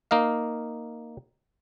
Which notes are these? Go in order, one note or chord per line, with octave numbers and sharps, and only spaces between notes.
A#3 D#4 D#5 F5